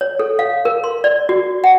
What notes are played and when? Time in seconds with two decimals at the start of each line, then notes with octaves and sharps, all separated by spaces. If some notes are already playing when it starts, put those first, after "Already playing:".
0.01 C#5
0.19 A4
0.39 F5
0.65 A#4
0.84 C6
1.04 D5
1.29 F#4
1.64 F#5